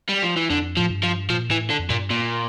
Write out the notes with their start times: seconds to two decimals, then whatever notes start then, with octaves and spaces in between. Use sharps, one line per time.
0.09 G3
0.23 F3
0.37 E3
0.50 F2 D3
0.77 A2 F3
0.90 G2
1.03 F3
1.30 A#2 F3
1.50 A2 E3
1.70 D3
1.79 F2
1.90 G2 A#2
2.11 A#2